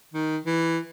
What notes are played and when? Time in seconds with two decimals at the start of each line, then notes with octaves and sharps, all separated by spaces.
0.14 D#3
0.46 E3